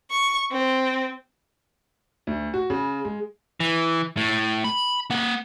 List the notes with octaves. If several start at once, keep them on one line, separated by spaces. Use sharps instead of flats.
C#6
C4
D2
F#4
C#3
G#3
E3
A2
B5
A#3 F#5